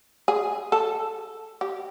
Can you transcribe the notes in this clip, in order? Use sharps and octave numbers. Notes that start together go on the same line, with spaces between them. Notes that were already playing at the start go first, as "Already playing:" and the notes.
G#4
A4
G4